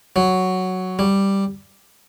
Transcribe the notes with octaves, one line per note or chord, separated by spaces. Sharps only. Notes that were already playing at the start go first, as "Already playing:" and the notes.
F#3
G3